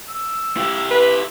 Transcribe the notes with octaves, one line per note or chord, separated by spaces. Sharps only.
E6
E4 G4
B4